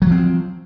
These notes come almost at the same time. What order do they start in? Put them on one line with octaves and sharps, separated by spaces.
F#3 F3 C4